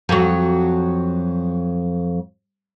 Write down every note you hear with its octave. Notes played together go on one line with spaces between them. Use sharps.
F2 F#3